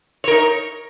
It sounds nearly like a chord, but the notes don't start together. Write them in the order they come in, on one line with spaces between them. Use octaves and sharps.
C#5 A#4 D#4